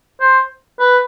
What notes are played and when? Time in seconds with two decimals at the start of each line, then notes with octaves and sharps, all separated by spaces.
0.20 C5
0.79 B4